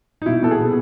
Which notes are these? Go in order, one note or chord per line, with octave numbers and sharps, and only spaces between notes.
D#4
B2 E4
B3 A4
G#4
B2